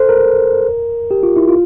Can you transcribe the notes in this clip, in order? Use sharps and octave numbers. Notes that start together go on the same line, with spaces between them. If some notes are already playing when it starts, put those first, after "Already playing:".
Already playing: A4 C5
A#4
G4
F4
E4
F4